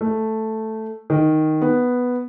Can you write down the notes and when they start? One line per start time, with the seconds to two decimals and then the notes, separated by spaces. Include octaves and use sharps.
0.01 A3
1.10 D#3
1.62 B3